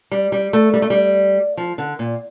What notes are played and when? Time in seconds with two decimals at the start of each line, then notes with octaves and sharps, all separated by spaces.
0.12 G3
0.32 G3
0.53 A3
0.74 G3
0.82 A3
0.90 G3
1.57 F3
1.78 D3
1.99 A#2